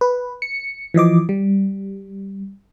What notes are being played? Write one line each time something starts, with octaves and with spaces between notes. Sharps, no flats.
B4
C#7
E3 F3 D#5 D6
G3